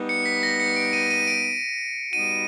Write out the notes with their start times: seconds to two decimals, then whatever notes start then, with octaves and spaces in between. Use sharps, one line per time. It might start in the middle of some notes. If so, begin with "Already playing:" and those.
Already playing: G3 B3 D#4
0.09 C#7
0.26 B6
0.43 A#6
0.60 C#7
0.76 D7
0.93 D#7
1.11 D#7
1.27 D7
2.13 G3 B3 D#4 F#4 D#7